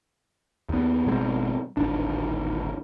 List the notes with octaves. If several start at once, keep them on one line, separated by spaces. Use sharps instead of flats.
D#2 B3
G#1 B2 G#3 C4
D1 G#1 D4